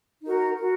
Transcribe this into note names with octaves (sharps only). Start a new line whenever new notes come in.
D#4 F#4 A#4
F#4 A#4